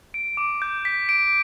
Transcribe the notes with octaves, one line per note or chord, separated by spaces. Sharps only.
D7
D6
G6
B6
D7